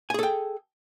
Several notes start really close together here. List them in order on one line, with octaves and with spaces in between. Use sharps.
G#5 G#4 A4 G5